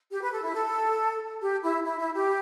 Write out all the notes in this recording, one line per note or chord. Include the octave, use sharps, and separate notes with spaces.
G4
B4
A4
E4
A4
G4
E4
E4
E4
G4